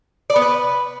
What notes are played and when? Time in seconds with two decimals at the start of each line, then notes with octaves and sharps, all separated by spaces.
0.30 D5
0.36 B3
0.42 B4